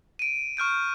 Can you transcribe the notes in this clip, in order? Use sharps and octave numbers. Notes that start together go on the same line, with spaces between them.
D7 D#7
C#6 F6 G6 D7